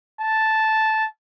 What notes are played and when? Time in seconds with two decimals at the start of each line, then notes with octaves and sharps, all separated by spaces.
0.20 A5